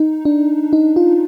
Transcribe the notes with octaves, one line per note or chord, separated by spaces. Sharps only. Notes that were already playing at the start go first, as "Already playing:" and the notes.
Already playing: D#4
D4
D#4
F4